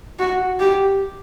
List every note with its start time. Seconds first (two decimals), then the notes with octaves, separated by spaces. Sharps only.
0.19 F#4
0.60 G4